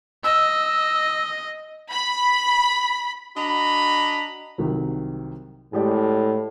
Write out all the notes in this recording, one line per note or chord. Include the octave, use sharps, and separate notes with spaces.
D#5 E6
B5
D4 F#4 D#5 A#5 B5
C2 D#3 F#3
A2 G#3 G4 D5